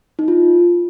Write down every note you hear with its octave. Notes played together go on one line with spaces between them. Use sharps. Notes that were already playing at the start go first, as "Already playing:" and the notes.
D#4
F4